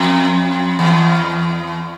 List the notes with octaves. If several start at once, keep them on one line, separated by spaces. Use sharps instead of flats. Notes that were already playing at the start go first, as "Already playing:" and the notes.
Already playing: F2
E2